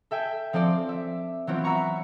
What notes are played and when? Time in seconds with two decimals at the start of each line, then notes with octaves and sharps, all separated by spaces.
0.11 A4 E5 G5 G#5
0.53 F3 C4 A4 C5 D5
0.89 E5
1.47 E3 F#3 B3 C4 F4
1.64 E5 F#5 A#5 C#6